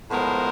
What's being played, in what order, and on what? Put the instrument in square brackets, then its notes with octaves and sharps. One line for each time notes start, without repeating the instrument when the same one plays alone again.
[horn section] A2 F3 G#3 B3 A#4 C5